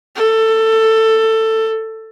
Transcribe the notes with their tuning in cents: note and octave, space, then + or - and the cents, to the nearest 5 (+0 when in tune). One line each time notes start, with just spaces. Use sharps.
A4 +15